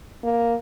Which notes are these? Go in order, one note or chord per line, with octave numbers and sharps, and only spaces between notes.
A#3